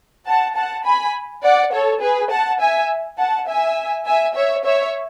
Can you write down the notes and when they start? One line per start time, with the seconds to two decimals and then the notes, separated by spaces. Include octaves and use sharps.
0.26 F#5 A5
0.56 F#5 A5
0.85 G#5 B5
1.43 D5 F#5
1.72 A4 C#5
2.01 G#4 B4
2.31 F#5 A5
2.60 E5 G#5
3.18 F#5 A5
3.47 E5 G#5
4.06 E5 G#5
4.35 C#5 E5
4.64 C#5 E5